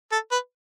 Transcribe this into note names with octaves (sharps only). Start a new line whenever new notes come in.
A4
B4